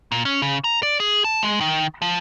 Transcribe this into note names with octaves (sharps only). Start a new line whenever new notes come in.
A#2
C#4
C#3
A#5
D5
G#4
A5
G#3
D#3
F3